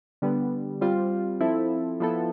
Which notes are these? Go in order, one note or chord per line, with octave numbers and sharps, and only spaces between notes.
D3 G3 B3
G3 C4 F4
F3 C4 E4 A4
F3 B3 E4 A4